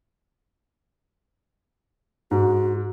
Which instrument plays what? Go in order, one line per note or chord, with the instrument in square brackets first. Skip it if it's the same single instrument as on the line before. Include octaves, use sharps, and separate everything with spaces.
[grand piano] G#2 [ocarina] F#4